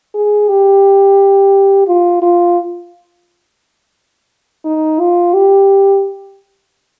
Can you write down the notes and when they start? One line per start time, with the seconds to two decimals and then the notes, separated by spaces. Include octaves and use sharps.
0.14 G#4
0.49 G4
1.88 F4
2.22 F4
4.65 D#4
5.00 F4
5.34 G4